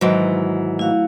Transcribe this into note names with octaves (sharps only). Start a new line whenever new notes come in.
G#2 D#3 E3 F#3
A3 E4 F#4 F5